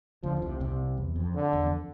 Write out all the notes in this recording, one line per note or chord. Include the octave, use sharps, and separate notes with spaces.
D2 D3 F3
D3
C2 C3
C2 C3
E2
F2
D3
E2
F2